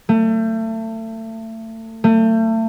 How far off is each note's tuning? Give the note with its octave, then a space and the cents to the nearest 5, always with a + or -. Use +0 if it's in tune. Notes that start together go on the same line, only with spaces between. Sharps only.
A3 +30
A3 +35